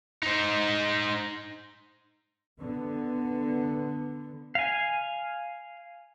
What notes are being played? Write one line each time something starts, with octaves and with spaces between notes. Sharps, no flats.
D#4 C5
D3 B3
F5 G#5